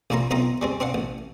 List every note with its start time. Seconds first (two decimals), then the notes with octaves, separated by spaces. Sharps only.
0.10 A1 A#2 A#3 E4 A#5 C6
0.31 B1 C4 D#4 F4 A#5 C6
0.62 G3 G#3 C4
0.80 C4 D4 F5 F#5
0.94 A1